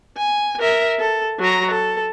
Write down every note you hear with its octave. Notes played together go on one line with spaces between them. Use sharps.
G#5
A#4 E5
A4
F#3 A#5
A4